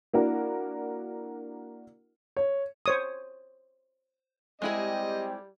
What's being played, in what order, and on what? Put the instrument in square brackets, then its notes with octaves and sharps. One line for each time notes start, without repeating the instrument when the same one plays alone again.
[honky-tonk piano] A#3 D4 E4 F#4 A#4
[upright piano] C#5
[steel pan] C5 C#5 D#6
[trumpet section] G3 G4 [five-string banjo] G#3 E4 G#4 [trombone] C4 [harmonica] D#5